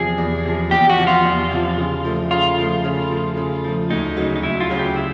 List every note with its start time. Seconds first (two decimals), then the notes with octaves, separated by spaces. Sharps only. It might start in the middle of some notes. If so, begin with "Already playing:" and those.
Already playing: E2 C3 F3 G#4
0.18 E2
0.45 C3 F3
0.71 E2 G4
0.90 F#4
0.97 C3 F3
1.07 F4
1.25 E2
1.51 C3 F3
1.78 C#3
2.04 F3 A3
2.31 C#3 F4
2.58 F3 A3
2.84 C#3
3.11 F3 A3
3.37 C#3
3.64 F3 A3
3.90 D2 D#4
4.17 C#3 F#3
4.36 D#4
4.43 D2 E4
4.60 F4
4.69 C#3 F#3
4.79 G4
4.96 E4